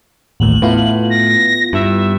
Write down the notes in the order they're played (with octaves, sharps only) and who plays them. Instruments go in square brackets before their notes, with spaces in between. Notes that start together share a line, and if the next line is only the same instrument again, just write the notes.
[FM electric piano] A1 D#2 A2 [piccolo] F#7
[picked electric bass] A2 [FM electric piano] B3 E4 F4
[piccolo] A#6
[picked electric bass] G2 [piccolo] E5